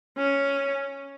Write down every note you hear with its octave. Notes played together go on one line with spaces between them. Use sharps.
C#4